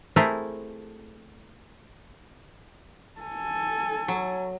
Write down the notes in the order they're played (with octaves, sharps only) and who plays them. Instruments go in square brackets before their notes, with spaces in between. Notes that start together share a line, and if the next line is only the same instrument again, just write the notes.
[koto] A3 C4 E4 G4 G#4 A#4
[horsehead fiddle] A4 G#5
[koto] F#3